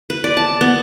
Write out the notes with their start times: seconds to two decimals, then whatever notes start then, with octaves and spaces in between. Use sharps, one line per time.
0.10 B4
0.24 D5
0.37 A5
0.61 B3